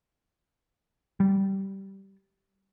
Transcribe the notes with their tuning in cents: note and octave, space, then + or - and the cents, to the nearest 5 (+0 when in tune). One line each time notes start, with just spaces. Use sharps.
G3 -15